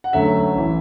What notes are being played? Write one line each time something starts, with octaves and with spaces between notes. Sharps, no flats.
F#5
D2 D3 F#3 A3 C#4 E5
A1 E3